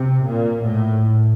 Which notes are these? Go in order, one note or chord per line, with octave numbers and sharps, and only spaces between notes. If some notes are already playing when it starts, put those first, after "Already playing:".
Already playing: C3
A#2
A2